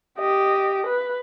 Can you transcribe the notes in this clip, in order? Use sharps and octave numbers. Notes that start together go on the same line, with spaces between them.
G4 D#5
B4